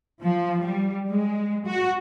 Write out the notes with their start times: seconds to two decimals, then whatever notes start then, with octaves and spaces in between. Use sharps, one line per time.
0.22 F3
0.64 G3
1.10 G#3
1.67 F#4